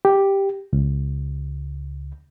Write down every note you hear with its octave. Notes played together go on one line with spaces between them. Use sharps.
G4
C#2